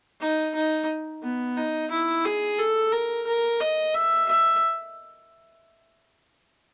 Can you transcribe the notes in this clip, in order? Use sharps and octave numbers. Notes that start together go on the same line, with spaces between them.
D#4
D#4
B3
D#4
E4
G#4
A4
A#4
A#4
D#5
E5
E5